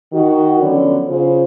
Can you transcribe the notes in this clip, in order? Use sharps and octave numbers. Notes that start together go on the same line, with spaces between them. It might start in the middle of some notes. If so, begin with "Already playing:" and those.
D#3 F#4
D3 F3 F#3 B3 C#4
C#3 F4 C5